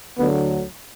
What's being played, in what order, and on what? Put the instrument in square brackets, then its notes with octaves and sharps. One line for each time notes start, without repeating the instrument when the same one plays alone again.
[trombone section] D2 D3 F#3 B3